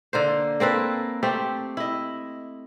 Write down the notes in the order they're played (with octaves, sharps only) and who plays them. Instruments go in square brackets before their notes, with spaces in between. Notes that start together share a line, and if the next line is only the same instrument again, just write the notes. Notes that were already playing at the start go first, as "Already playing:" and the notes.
[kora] D3 A#3 C5
A#3 C4 A4 B4
A3 C4 G4
E4 D#5